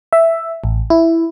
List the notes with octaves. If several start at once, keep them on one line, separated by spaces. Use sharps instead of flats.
E5
A1
E4